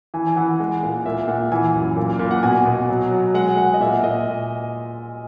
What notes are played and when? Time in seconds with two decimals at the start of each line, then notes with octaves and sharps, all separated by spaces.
0.14 E3 G#5
0.27 G#5
0.36 E3 F#5
0.60 G#3
0.83 A#2
1.06 A#2 E5
1.28 A#2 F#5
1.52 E3 G#5
1.75 F#2
1.96 A#2
2.19 A#2
2.31 F#5
2.43 B2 G#5
2.65 B2
2.89 F#3
3.11 F#3
3.34 G#3 F#5
3.57 G#3 F#5
3.74 D#5
3.81 A#2 E5
4.03 A#2 D#5